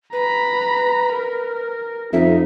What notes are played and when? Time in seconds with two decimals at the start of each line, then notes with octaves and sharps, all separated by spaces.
0.13 B4 A#5 B5
1.13 A#4
2.13 F2 D#4 E5